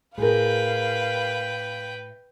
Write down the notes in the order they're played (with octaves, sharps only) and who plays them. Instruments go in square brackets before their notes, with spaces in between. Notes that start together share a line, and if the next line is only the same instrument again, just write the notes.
[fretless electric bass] A2 [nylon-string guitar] G#4 A#4 [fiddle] B4 G5 [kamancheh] F5